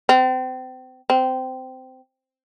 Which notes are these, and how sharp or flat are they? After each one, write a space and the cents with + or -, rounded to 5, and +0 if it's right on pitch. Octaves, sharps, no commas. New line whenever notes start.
C4 -30
C4 -15